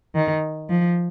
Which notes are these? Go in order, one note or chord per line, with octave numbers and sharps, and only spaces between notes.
D#3
F3